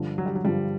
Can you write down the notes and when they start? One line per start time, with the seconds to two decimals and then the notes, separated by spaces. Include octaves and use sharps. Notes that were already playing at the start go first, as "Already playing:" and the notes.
Already playing: G2 D3 F3
0.18 F#3
0.26 G3
0.35 F#3
0.44 G2 D3 F3 G3